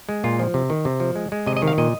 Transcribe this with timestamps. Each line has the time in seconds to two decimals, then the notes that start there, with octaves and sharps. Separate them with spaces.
0.09 G#3
0.24 A#2 F4
0.39 F3
0.54 C3
0.70 D#3
0.85 C3
1.00 F3
1.16 G#3
1.32 G#3
1.46 C3 D#5
1.57 D#5
1.62 D#3
1.68 F5
1.78 A#2 D#5